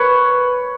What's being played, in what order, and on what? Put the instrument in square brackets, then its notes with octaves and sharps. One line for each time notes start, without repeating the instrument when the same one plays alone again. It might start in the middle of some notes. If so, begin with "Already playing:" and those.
Already playing: [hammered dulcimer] B4 C#5